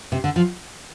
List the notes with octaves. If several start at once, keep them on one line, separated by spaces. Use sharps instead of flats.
C3
D3
F3